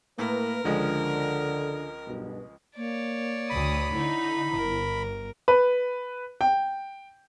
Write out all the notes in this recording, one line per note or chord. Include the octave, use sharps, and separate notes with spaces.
A2 A#3 A#4 B4
C#2 D3 F3 G#3
B1 G2 B2
A#3 C#5 D5
D2 B5 D#6
D3 D#4 E4
G1 A#4
B4
G5